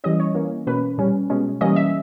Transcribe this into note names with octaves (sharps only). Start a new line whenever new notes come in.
E3 G3 C#4 D#5
C#5
E3 A#3 C#4
B2 A#3 C#4 B4
A#2 G3 C#4
B2 G#3 C#4
E3 G3 A#3 C#4 D#5
E5